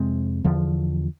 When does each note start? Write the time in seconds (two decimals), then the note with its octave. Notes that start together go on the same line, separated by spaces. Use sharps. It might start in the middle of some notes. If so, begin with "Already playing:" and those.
Already playing: F2 C3 G#3 C4
0.44 E2 D3 F3